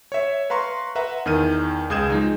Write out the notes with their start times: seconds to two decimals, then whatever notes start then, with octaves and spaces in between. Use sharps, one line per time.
0.12 C#5 E5
0.50 B4 F5 A#5 C6 C#6
0.95 B4 E5 F#5 A#5
1.26 E2 D#3 F6 D#7
1.90 C#2 G#4 D#6 G6 G#6 E7
2.10 F3 G#3 D#4